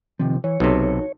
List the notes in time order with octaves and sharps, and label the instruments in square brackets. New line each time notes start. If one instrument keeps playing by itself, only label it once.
[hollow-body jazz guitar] C3 F3 [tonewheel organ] D#3 C4
[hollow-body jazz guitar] E3 [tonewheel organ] C#5
[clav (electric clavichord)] B1 C3 [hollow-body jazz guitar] D#4 F#4 A4